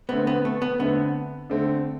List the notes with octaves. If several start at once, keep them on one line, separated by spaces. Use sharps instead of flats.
D3 A3 B3 C4
B3
A3
B3
D3 A3 B3 C4
D3 A3 C4